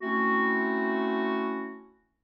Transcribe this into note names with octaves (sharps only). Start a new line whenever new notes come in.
A3 C4 C#4 E4 F#4